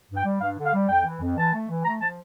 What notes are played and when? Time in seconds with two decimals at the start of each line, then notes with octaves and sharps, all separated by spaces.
0.10 G2
0.17 G5
0.25 G3
0.41 G2 F5
0.57 D3
0.66 F5
0.73 G3
0.89 F2 G5
1.05 E3
1.21 F2
1.36 E3 A5
1.53 A3
1.69 E3
1.85 A3 A#5
2.01 F3 A5